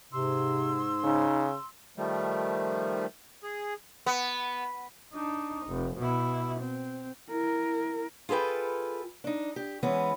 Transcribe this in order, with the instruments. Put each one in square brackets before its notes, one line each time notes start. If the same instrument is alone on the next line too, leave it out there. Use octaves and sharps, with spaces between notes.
[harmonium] G#2 [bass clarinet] C3 [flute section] C6 E6
[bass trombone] C#3 [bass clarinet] D#4
[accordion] D#3 F3 G3 A3
G#4
[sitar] B3
[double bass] D4 D#4
F1
B2 E4
C4
[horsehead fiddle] E4 A#4
[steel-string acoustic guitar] F4 G#4 A4 B4 G5
D4 D#4
G4
E3 G#3 B3 C#4